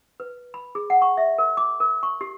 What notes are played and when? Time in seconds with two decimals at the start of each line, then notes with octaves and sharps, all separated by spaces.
0.20 B4
0.54 B5
0.75 G#4
0.90 F#5
1.02 C#6
1.17 E5
1.38 A#4
1.57 D6
1.80 A#4
2.03 C#6
2.21 G4